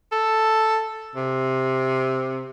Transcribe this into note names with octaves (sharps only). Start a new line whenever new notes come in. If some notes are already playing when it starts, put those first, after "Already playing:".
A4
C3